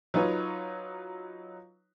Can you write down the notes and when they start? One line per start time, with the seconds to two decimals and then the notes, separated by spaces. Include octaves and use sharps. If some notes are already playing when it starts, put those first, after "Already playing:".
0.14 F#3 D#4 F4 B4 C#5